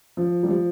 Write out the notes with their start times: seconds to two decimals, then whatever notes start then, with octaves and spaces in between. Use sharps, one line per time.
0.17 F3
0.43 G3
0.48 F3